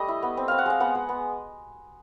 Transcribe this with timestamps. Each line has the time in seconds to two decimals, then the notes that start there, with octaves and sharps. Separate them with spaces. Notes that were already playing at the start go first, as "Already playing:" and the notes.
Already playing: G3 A3 D#5
0.08 E4
0.23 B3
0.37 C4
0.48 C4 F5
0.58 F#5
0.66 G#3 F5
0.80 B3 F#5
0.95 G#3
1.09 B3